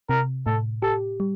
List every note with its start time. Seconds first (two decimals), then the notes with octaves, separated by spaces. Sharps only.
0.09 C3 A#4
0.46 A2 A4
0.82 G4 A4
1.20 G3